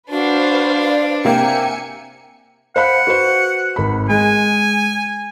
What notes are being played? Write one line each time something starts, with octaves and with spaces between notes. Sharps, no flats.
D4 F#4 B4 C5 F5
D5
C3 A#3 E5 G5 G#5 C#7
C5 F5 F#5 B5
F#4 B4 C5
G#1 B5
G#3 G#5